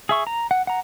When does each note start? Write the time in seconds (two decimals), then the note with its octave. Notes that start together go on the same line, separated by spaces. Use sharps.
0.09 G#4 E5 C#6
0.27 A#5
0.51 F#5
0.67 F#5 A#5